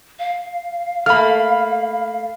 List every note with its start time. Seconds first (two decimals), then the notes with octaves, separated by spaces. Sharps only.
0.19 F5
1.06 A3 A#3 B5 F6